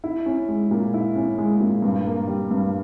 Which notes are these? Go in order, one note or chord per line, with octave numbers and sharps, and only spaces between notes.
E4
C#4
G#3
A#2
E4
C#4
G#3
A#2
G2
A#3
G3
G2